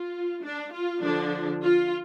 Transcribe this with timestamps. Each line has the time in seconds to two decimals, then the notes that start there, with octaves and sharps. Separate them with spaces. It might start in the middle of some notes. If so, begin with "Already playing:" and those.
Already playing: F4
0.43 D4
0.72 F4
1.02 D3 F3 D4
1.63 F4